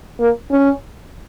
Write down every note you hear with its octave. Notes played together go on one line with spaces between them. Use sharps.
A#3
C#4